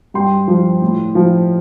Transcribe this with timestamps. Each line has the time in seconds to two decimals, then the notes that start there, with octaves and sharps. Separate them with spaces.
0.14 G2 G5 C6
0.48 F3
0.82 A2
1.15 F3